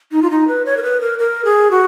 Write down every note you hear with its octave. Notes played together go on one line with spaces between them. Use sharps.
D#4
F4
D#4
B4
C#5
A#4
B4
A#4
A#4
G#4
F#4